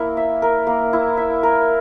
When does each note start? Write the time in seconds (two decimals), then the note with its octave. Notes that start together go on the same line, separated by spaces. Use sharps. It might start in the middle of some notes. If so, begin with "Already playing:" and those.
Already playing: A#3 E4 A#4
0.17 E5
0.42 A#4
0.67 A#3
0.93 E4
1.17 E5
1.43 A#4